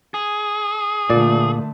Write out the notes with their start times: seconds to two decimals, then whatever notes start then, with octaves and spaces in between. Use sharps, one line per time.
0.14 G#4
1.10 A#2 D3 A3 D5